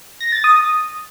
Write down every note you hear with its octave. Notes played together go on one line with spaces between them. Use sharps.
A#6
A6
D#6